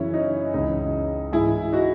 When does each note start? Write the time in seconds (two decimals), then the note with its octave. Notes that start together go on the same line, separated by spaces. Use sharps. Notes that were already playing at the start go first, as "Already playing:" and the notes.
Already playing: F#2 C#3 E3 C#4 E4
0.13 D#4
0.54 C#2 C#3 E3 D#4
1.32 G#2 E3 E4 G#4
1.72 D#4 F#4